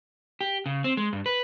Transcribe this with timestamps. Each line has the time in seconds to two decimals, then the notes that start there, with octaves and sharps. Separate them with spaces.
0.41 G4
0.66 C#3
0.84 C4
0.97 G#3
1.13 G2
1.26 B4